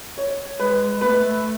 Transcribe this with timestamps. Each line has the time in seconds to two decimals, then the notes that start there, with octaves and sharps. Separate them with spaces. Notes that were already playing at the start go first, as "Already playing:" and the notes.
0.18 C#5
0.59 G#3 B4
1.01 B3 B4
1.05 A3